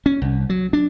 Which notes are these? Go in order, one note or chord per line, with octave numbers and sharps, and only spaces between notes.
C#4
C2
F#3
D4